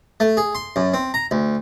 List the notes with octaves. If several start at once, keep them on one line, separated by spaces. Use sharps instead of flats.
A3
G#4
C6
F#2
C4
A#5
D2